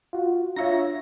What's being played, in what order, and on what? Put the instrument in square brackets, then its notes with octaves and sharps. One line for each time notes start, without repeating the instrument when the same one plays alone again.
[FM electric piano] F4 F#4
[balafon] D4 F4 F5 [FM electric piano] C#5 E5 A#6